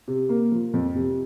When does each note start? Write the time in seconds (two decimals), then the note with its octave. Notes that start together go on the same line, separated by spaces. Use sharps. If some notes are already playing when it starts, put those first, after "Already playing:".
0.08 C3
0.29 A#3
0.52 F3
0.74 F2
0.95 C3